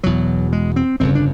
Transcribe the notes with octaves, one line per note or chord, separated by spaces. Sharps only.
E1 E2 B2 F#3
G#3
C4
G1 F2 C#3 C4
D4